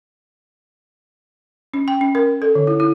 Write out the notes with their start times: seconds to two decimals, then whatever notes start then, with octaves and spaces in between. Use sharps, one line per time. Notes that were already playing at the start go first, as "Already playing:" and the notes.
1.74 C#4
1.88 G5
2.01 C#4
2.15 A#4
2.42 A4
2.55 D3
2.67 E4
2.80 E4